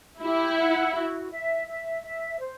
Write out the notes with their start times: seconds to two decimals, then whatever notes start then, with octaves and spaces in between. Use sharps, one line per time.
0.21 E4 G4
0.58 F#5
0.94 F#4
1.31 E5
1.67 E5
2.03 E5
2.39 C5